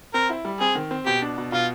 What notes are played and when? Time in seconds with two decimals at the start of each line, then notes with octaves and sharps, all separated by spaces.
0.14 C4 A#4
0.29 E4
0.45 G3
0.60 C4 G#4
0.75 D#3
0.91 C4
1.06 B2 G4
1.22 D4
1.38 B2
1.52 B2 F4